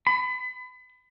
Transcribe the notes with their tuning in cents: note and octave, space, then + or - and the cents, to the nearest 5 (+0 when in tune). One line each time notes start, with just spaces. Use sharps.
B5 +30